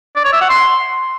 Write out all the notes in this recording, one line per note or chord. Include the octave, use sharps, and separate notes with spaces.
D5
C#5
E5
F#5
C6